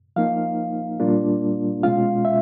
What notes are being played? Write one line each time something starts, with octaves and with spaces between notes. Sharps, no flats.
F3 A#3 D#4 F5
A#2 G3 A#3 D4 F4
B2 G#3 C#4 F4 F5
E5